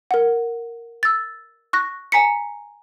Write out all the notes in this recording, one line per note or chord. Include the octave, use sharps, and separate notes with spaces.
A#4 F#5
E6 A6
C#6 F#6 A#6
G#5 A#5 B6 C#7